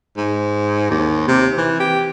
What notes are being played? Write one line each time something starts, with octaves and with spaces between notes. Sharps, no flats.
G#2
D#2
C3
E3
G4